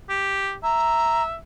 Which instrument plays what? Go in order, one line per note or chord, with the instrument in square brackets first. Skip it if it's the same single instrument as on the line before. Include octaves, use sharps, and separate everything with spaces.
[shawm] G4
[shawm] E5 [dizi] A#5